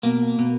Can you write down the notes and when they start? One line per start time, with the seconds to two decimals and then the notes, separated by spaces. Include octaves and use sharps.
0.03 B2 A#3
0.39 B2